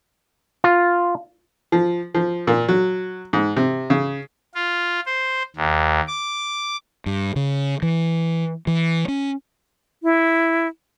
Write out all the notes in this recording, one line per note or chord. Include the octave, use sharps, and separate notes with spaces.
F4
F3
F3
A#2
F#3
G#2
C3
C#3
F4
C5
D#2
D6
G2
C#3
E3
E3
C#4
E4